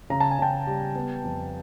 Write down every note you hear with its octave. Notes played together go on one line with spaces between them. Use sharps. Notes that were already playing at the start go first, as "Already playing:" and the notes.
C#3 A#5
A5
G#5
C#3 G5 A5
G3
B3
F2